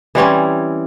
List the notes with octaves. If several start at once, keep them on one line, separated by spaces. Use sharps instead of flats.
E3 G3 C4 C#4